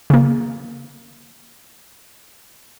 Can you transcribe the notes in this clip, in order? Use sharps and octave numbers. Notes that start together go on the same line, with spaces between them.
C#3 A#3